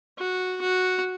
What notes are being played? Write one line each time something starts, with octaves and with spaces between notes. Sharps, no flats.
F#4
F#4